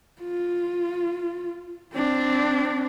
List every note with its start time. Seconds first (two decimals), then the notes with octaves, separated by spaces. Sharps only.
0.21 F4
1.94 C4 D4